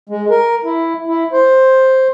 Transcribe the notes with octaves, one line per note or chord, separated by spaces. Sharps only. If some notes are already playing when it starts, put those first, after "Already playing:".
G#3
A#4
E4
E4
C5